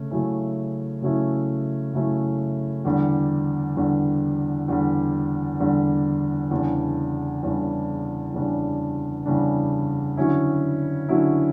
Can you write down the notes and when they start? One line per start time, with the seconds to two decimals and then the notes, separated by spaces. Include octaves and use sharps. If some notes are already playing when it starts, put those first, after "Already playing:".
Already playing: C#3 A3 C#4
0.11 C#3 F#3 A3 C#4 E4
1.02 C#3 F#3 A3 C#4 E4
1.94 C#3 F#3 A3 C#4 E4
2.85 E2 D3 G3
3.77 E2 D3 G3
4.68 E2 D3 G3
5.60 E2 D3 G3
6.51 E2 C#3 G3 D4
7.43 E2 C#3 G3 D4
8.34 E2 C#3 G3 D4
9.26 E2 C#3 G3 D4
10.17 D3 F#3 C#4 E4
11.09 D3 F#3 C#4 E4